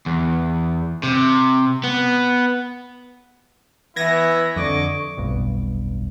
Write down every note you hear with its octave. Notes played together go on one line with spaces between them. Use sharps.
E2
C3
B3
E3 B3 E4 G#6 A#6
F2 D3 D#5 C#6 D6
F1 B1 G2